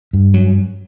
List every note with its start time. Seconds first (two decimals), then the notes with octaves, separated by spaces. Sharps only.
0.13 G2
0.34 F#3